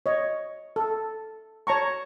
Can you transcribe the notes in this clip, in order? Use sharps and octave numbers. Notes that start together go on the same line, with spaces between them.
C#5 D#5
A4
C#5 A5 A#5 C#6